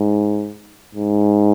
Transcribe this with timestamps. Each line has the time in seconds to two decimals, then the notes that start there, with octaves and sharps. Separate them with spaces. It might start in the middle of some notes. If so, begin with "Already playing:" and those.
Already playing: G#2
0.95 G#2